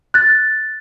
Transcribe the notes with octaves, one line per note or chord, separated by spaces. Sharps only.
F#6 A6